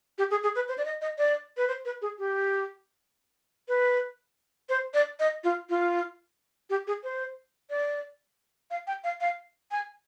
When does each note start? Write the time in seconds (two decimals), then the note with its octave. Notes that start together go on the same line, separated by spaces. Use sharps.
0.18 G4
0.31 G#4
0.43 G#4
0.56 B4
0.68 C5
0.78 D5
0.85 D#5
1.01 D#5
1.18 D5
1.57 B4
1.68 C5
1.85 B4
2.02 G#4
2.19 G4
3.68 B4
4.69 C5
4.94 D5
5.20 D#5
5.44 F4
5.69 F4
6.70 G4
6.87 G#4
7.04 C5
7.70 D5
8.71 F5
8.87 G5
9.04 F5
9.21 F5
9.71 G#5